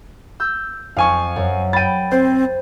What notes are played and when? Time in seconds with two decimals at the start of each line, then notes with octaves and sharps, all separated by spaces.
0.40 E6 G6
0.97 F2 F5 G#5 C#6
1.36 F#2
1.73 G5 B5 A6 D#7
2.12 C4 C5